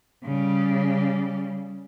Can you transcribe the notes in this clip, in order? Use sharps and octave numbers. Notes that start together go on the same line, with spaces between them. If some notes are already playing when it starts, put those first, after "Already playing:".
C#3 G3